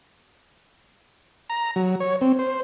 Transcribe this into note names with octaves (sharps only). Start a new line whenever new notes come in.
A#5
F#3
C#5
C4
C5